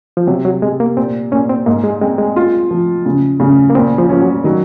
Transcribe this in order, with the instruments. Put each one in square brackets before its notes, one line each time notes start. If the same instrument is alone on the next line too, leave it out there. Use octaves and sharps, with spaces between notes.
[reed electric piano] F3
[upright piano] C3 [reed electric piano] F#3
[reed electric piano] F#3
[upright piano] C3 [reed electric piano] G#3
[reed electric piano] A#3
[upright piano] A#2 [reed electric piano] C4
[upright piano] A#2 [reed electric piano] C#4
[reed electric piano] C4
[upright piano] G#2 [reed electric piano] A#3
[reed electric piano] G#3
[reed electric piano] G#3 [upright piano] C4
[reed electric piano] G#3
[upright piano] F4
F3
C#3
C#3
[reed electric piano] A#3
[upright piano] A#2 [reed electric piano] C4
[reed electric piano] F3
[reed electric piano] F3 [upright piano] C#4
[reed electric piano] F#3
[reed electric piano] D#3 [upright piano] F#3